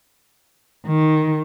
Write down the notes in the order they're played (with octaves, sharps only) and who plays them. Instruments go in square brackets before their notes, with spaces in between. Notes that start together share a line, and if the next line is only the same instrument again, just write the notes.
[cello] D#3